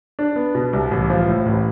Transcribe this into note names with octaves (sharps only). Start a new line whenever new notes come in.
D4
B3
B2
C2
A1
F3
A2
A1